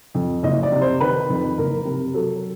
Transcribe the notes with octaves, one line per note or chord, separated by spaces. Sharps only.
F2
F#1 D#5
D5
C3
C5
D#3 B4
F2
F#1 A#4
C3
F#3 A4